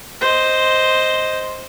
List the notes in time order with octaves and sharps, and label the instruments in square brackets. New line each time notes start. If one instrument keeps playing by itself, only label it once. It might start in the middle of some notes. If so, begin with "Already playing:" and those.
[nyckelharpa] C5 D#5